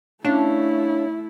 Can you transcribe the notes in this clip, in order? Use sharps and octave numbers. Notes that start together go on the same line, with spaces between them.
A3 C#4 D4 E4 F5